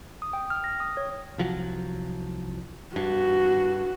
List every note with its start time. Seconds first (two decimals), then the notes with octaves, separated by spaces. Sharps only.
0.22 D#6
0.33 G5
0.50 F6
0.64 A#6
0.80 D#6
0.97 C#5
1.38 C2 F3 F#3
2.96 G2 F#4